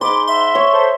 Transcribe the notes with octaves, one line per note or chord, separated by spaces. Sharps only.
G#2 B5 C6 D6
E5 C6
C#5
A4 C5